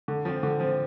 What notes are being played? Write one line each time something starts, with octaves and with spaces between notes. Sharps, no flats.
D3
F3 C4
D3
F3 C4